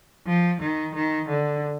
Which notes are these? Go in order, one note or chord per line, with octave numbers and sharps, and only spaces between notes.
F3
D#3
D#3
D3